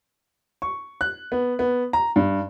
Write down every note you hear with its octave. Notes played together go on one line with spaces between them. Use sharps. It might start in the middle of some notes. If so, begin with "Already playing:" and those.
C#6
F#6
B3
B3
A#5
G2